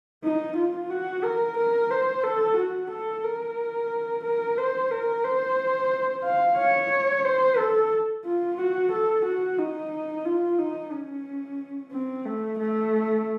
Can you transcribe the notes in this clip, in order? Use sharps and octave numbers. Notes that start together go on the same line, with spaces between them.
D#4
F4
F#4
A#4
A#4
C5
A4
F#4
A4
A#4
A#4
C5
A#4
C5
F5
C#5
C5
A4
F4
F#4
A4
F#4
D#4
F4
D#4
C#4
C4
A3
A3